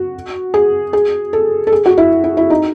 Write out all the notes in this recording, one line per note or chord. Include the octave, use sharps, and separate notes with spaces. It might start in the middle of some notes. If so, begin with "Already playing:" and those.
Already playing: F#4
G#4
G#4
A4
A4
G#4
F#4
E4
E4
E4
D#4